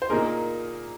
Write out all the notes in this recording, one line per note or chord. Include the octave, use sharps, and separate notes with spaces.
C5
A#2 A#3 D#4 G#4 A#4